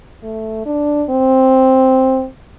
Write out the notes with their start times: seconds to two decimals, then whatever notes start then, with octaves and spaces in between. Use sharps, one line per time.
0.23 A3
0.66 D4
1.10 C4